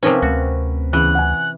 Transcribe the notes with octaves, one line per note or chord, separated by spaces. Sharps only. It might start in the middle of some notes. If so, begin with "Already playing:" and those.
C3 F3 C4 C#4 D#4 A#4 B4
D2 F#4
E2 C#3 E3 F#6
F#5 G#5